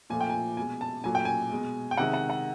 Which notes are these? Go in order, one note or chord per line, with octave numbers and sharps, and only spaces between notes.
A#2 F3 A3 G#5
G5
G#5
B2 G#3 G#5
A5
A#2 F#3 A3 G#5
G5
G#5
B2 G#3
G5
C3 D#3 G#3 F#5
F#5
F#5